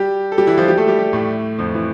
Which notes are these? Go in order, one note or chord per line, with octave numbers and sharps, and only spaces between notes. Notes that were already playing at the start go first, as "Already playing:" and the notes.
Already playing: G3 G4
A4
G3 G4
E3 E4
F3 F4
G3 G4
A3 A4
G3 G4
G3 G4
A2 A3
F2 F3
E3